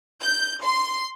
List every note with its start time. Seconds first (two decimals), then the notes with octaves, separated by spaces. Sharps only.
0.23 G6
0.64 C6